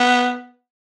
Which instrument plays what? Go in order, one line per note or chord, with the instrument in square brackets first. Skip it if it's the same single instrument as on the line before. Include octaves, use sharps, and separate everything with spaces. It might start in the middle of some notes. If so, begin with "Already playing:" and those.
Already playing: [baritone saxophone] B3